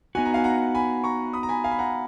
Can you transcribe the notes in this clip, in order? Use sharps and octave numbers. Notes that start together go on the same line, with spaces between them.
B3 D#4 F#4 G#5
A#5
F5 G#5
F#5 A#5
G#5 B5
A#5 C#6
B5 D#6
A#5
G#5 B5
F5 G#5
B5
F#5 A#5